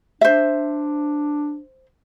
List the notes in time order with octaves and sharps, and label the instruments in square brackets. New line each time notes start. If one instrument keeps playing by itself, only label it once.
[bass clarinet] D4 [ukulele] C5 E5